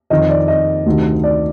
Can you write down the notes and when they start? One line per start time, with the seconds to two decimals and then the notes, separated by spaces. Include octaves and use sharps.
0.10 F2 D#3 D#5
0.29 D5
0.48 D#5
0.86 D2 C3 D#3
1.24 D5